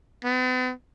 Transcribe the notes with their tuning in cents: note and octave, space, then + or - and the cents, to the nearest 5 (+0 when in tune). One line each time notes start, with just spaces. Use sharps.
B3 +45